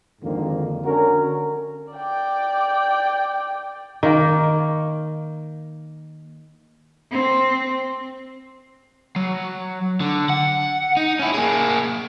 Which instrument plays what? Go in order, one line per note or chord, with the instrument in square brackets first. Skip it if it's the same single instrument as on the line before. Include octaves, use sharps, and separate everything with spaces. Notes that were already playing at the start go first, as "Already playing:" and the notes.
[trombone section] G#1 F2 G#2 D3 D#3 A#3
D3 C#4 F#4 A#4
[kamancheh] D5 G5
[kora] D#3 A#3
[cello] C4
[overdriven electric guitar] F#3
D3
F#5
D#4
C#4 E4
A#3 G#4